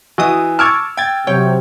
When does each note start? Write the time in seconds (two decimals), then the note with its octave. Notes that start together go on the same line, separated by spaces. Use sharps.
0.18 E3 F#4 D#5 D#6
0.59 A5 C#6 D6 E6 F6 G#6
0.97 G5 G#6 A6
1.27 C3 F#3 C#5 G5